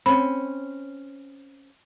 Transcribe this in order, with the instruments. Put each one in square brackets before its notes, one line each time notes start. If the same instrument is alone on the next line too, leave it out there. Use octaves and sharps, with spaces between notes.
[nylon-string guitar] C4 C#4 [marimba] B5